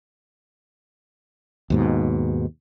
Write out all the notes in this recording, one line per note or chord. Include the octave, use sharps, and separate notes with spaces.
D#2 G#2 B2